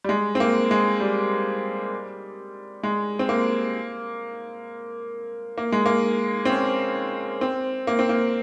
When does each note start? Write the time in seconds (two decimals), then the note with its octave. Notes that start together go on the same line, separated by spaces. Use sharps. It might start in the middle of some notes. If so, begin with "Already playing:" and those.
0.04 G3
0.09 G#3
0.35 C4
0.40 A#3
0.71 G#3
1.00 G3
2.83 G#3
3.19 C4
3.29 A#3
5.58 A#3
5.72 G#3
5.86 A#3
6.45 C4
6.50 C#4
7.41 C4
7.87 A#3
7.99 C4
8.09 A#3